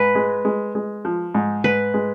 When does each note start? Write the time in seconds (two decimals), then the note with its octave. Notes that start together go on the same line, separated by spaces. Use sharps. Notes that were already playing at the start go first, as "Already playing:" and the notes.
Already playing: G#2 B4
0.15 G#3
0.45 G#3
0.75 G#3
1.05 F3
1.35 G#2
1.64 G#2 B4
1.94 G#3